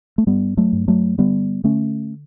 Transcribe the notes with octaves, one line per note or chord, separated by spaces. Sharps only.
A3
G2 G3 B3
F#3 A3
G2
F#3 A3
D3 G3 B3
D3 A3 C#4